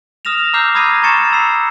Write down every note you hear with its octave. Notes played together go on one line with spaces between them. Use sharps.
D#6 F6 A#6 E7 F7
A#5 D6 E6 F6 G6 C7
B5 D#6 G#6 A#6 C7 D#7
A#5 B5 C#6 A6 C#7 E7
A#5 B5 E6 C7 C#7